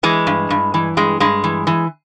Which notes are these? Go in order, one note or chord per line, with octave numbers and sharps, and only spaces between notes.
E3 G#3
G2
G2
E3
G2 G#3
G2 G#3
E3
E3